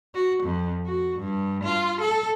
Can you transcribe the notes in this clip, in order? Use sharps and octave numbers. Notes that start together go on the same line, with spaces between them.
F#4
F2
F#4
G2
F4
A4